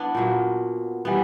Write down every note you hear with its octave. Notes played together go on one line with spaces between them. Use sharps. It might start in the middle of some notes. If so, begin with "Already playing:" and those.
Already playing: B3 D4 E4
A#2 F#3 A#3
E3 G3 B3